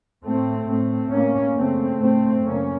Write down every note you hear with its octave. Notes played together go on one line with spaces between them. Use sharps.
A2 A3 C4
A2 A3 C4
A2 A#3 C#4
F#2 C#3 A3 C4
A2 A3 C4
F#2 C#3 A#3 C#4